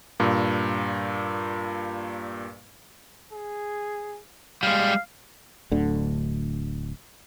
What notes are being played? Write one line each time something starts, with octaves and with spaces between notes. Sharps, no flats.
G2 A#2
G#4
G3 G#3 F5
D1 D2 D3